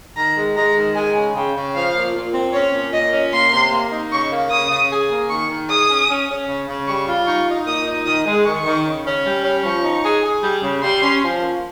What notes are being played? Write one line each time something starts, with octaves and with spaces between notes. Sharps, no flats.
D#3 A#5
G#3
G#3 A#5
D#3
G#3 G#5
C#3
C#3 G5
C#3
F3 F5
A#2
A#2
C4
C#4 C#5
A#2
A#2 D#5
C#4
A#3 C6
C3
A#3
D#4
C#3 C#6
A#3
C#3 D#6
C#3
G#4
A#3
D#3 C#6
D#3
G#4 D#6
C#4
C#4
C#4
C#3
C#3
G3 C#6
F4
D#4 C#6
D#4
A#2 D#6
D#4
D#3 D#6
G#3
D#3 C#6
D#3
C#3
C#4
G3
C#4
F3 C#6
D#4
G#4
G#4
G3
C#3
G3 C6
C#4
F3
A#3